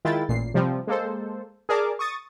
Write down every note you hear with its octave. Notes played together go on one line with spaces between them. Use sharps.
D#3 G#3 E4 F4 G5 A6
A1 A#2 C7
C3 F3 G3 C4
G#3 A#3 A4 C5
G#4 A#4 D5 A5 D6
C#6 D#6 A6